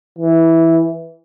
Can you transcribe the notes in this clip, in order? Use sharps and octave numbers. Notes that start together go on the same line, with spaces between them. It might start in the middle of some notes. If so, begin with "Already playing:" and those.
E3